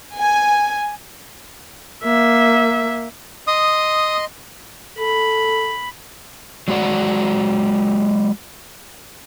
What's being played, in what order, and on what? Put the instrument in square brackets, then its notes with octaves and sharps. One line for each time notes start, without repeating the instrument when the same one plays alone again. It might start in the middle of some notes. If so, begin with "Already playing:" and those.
[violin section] G#5
[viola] A#3 E5
[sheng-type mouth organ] D#5 C6 [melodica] D#6
[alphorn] A4 [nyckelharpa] B5
[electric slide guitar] F#3 G#3 F#4 D5 F#5